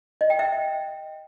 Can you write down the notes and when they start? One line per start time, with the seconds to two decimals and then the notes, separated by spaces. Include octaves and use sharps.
0.21 D#5
0.30 G5
0.39 E5